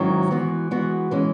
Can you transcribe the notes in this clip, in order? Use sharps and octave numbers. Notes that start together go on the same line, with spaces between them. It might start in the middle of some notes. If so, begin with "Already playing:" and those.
Already playing: G#2 D#3 F#3 C#4 E4
E3 G#3 B3 F#4
E3 G#3 B3 F#4
E3 G#3 C#4